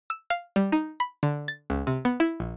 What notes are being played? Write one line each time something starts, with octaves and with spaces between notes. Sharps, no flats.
E6
F5
G3
D#4
B5
D3
A6
C#2
C3
B3
E4
A#1